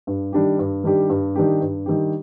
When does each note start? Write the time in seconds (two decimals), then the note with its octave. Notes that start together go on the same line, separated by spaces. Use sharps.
0.07 G2
0.33 D#3 G3 D4 G4
0.59 G2
0.84 D#3 G3 D4 G4
1.10 G2
1.35 D#3 G3 D4 G4
1.61 G2
1.86 D#3 G3 D4 G4